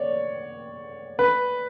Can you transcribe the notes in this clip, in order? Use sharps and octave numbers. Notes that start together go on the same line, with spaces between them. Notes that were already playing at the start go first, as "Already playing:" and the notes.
Already playing: C#5 D5
B4